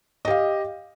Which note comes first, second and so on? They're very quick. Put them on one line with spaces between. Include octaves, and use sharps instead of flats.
D#5 G4 F5